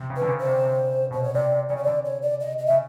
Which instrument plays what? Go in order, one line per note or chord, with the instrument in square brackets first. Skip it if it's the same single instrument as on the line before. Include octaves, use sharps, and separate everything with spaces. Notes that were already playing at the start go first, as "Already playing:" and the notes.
Already playing: [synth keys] C3
C#3
[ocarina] B4
[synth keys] D3
C#3
[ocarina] C5
[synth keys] C3
C3
[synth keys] B2 [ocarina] C5
[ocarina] C#5
[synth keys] C3 [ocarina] D5
[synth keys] C3
[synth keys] C#3 [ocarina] D5
[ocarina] C#5
[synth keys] D3 [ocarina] D5
[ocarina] C#5
D5
D#5
D#5
E5
[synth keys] C#3